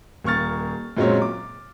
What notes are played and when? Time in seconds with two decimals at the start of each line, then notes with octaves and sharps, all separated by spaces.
0.24 D#1 A#3 C#6 F6 A6
0.97 F#2 A#2 F#3 G#3 C4 C#5
1.22 D6